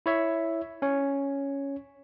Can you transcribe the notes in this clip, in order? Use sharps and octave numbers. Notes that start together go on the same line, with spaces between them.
E4 C#5 E5
C#4 C#5